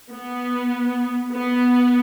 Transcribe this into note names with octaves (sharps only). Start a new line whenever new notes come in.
B3
B3